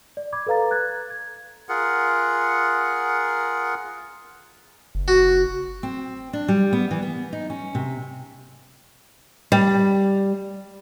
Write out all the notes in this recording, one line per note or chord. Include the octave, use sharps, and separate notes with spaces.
D5
B5 D6 G#6
A4 B4 F5 A#5 A6
F#6 G#6 A6
G#6
F4 G#4 A#4 F#5
F#1
F#4
C4
D4
G3
B3
E3
B3
D#4
C#4
C3
G3